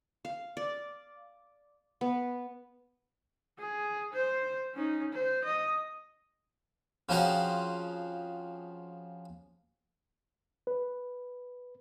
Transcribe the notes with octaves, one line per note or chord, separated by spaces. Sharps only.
F5
D5
B3
G#4
C5
C#4 D#4
C5
D#5
C#3 F3 C4 C#4 F#4 G#4
B4